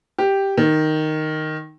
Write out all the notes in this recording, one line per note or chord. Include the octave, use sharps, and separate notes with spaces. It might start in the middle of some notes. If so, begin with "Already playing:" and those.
G4
D#3